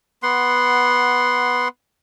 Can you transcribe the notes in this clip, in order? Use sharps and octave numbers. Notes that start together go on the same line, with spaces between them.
B3 F#5 C6